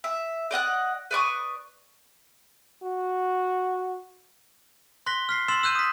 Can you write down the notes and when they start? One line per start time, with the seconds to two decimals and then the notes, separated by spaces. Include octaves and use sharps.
0.04 E5
0.51 D5 D#5 F#5 F#6
1.11 B4 D5 C#6 D#6
2.82 F#4
5.06 C6 F#6 A#6 B6 G7
5.29 F6 B6 C7
5.48 C6 E6 A6 E7 F#7
5.63 E6 F#6 G6 D#7
5.75 D#6 B6